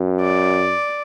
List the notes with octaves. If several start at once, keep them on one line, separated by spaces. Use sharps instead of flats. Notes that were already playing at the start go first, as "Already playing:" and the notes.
Already playing: F#2
D5